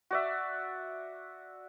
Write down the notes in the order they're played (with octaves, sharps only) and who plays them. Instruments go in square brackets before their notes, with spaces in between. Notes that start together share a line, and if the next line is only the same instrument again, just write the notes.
[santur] F#4 D5 E5